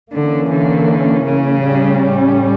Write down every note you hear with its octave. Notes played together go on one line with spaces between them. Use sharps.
D3 E3 A#3 C#4
D3
C#3
A2 G3 C#4